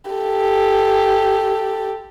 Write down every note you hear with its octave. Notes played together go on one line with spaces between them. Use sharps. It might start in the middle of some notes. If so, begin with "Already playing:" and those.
G4 A4